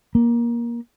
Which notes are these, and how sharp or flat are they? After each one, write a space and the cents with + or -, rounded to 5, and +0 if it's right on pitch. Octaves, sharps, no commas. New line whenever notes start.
A#3 +20